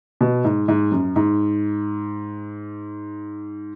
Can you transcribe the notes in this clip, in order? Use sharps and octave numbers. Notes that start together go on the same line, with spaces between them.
B2
G#2
G#2
F#2
G#2